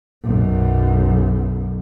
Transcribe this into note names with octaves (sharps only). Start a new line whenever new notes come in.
B1 F#2